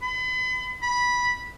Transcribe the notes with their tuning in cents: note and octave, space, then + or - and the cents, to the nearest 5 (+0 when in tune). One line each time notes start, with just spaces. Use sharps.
B5 +40
B5 -10